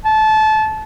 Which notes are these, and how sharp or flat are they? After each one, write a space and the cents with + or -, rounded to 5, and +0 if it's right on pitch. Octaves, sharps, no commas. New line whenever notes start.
A5 -25